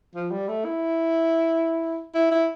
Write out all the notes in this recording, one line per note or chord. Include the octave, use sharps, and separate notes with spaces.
F3
G3
A3
E4
E4
E4